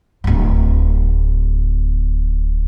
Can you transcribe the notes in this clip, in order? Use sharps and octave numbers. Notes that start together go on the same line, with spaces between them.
D1 G#1